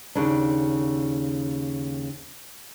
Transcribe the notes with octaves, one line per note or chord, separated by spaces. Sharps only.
D#2 C#3 D4